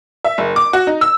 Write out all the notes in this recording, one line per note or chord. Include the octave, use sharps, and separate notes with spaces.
E5
F#1
D6
F#4
D#4
E6